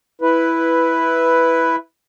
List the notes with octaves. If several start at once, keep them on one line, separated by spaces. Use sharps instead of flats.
E4 B4